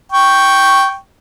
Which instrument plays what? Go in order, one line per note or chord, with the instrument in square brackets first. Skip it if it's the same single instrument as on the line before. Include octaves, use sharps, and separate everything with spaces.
[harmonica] G5 C#6